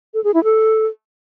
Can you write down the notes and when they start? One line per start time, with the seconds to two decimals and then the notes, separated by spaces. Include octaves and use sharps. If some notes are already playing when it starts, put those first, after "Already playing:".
0.14 A4
0.24 G#4
0.34 E4
0.44 A4